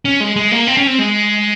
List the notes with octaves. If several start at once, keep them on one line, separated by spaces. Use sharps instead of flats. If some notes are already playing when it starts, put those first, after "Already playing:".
C#4
G#3
G#3
A#3
C4
C#4
C4
G#3